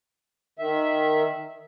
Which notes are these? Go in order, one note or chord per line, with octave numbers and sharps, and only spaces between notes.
D#3 E5